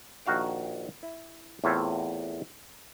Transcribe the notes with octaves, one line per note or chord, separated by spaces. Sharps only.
A#1 D#3 F#4 F5 G5
E4
E2 A2 C4 F4 C#5 E5